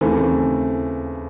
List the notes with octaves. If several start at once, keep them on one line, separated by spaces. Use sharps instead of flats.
D#2 C#3 E3 A3 C4